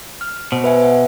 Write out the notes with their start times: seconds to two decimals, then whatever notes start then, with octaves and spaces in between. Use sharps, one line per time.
0.21 F6
0.52 B2 C5
0.64 B4 E5 G#5
0.82 E5 F#5